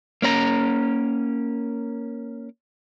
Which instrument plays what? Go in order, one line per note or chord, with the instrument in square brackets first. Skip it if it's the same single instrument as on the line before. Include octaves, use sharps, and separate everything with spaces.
[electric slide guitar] A#3 C#4 B4 A#5